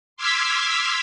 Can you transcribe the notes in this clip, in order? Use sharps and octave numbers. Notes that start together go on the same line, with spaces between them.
C6 D6 E6 F6 G#6 B6